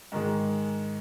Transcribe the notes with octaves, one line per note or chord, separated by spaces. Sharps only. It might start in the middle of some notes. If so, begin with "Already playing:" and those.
G#2 D#3 G#3